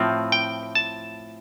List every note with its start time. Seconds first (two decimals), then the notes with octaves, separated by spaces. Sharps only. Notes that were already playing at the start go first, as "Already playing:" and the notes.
Already playing: A2 F3 C4
0.32 G5
0.75 A5